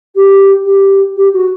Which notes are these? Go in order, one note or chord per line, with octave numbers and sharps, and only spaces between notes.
G4
G4
G4
F#4